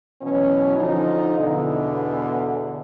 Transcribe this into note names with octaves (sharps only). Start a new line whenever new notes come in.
B2 E3 F#3 C#4
D3 F3 D#4
E2 B2 D3